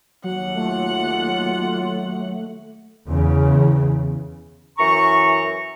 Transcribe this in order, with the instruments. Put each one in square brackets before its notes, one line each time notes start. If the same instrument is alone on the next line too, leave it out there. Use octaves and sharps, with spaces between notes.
[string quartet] D#2 F#5 [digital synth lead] F#3
[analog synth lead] A3 [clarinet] F4
[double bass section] E2 C#3
[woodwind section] F#2 E3 A#5 C#6